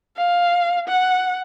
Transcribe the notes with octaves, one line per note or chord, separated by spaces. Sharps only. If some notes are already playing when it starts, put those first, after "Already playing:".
F5
F#5